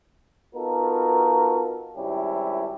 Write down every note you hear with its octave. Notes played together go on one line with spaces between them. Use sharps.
B3 D#4 F4 F#4 A4 A#4
G#1 C3 G3 C#4 E4 G4